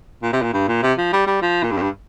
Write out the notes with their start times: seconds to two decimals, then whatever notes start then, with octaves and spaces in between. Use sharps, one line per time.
0.23 A#2
0.33 C3
0.42 A#2
0.54 G2
0.68 A#2
0.83 C3
0.98 F3
1.13 G3
1.27 G3
1.42 F3
1.63 A#2
1.71 G2
1.78 F2
1.82 G2